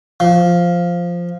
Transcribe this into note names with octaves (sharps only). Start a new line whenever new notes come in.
F3